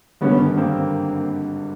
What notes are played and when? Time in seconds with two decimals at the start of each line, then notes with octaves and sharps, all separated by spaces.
0.21 G#1 G2 D3 G3 B3 C#4
0.57 A#3 C4